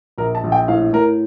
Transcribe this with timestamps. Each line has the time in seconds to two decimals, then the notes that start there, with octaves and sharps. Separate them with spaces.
0.18 A#1 A#4
0.35 A5
0.44 A#1
0.52 G5
0.68 A2 F5
0.93 A2 A#4